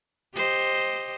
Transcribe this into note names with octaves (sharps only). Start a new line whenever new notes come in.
G4 C5 D#5